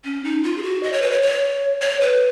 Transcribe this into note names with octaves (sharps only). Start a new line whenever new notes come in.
C#4
D#4
F4
G#4
F#4
D#5
C#5
B4
C#5
C#5
C#5
B4